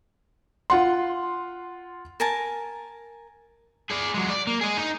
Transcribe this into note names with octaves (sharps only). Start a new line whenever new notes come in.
F4 F#5 C6
A#4 G#5 A5
G#4 D5
F#3 G#3
D5
A#3
G#4 D#5
D#4